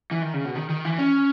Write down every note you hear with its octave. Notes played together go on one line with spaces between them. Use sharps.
E3
D#3
C#3
B2
D#3
D#3
E3
C#4